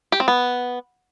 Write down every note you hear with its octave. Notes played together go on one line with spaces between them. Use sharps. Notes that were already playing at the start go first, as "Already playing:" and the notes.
G4
C4
B3